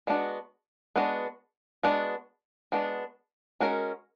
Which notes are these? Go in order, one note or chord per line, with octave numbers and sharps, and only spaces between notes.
G#3 B3 D4 F#4
G#3 B3 D4 F#4
G#3 B3 D4 F#4
G#3 B3 D4 F#4
G#3 C#4 F#4 A#4